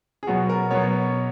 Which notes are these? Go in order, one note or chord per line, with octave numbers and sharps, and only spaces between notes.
G#4
B2 F#3 B3 F#4
A#4
B2 F#3 B3 C#5